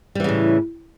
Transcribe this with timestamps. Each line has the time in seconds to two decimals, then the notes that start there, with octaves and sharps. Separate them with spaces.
0.15 G3
0.20 E3
0.24 C#3
0.29 A2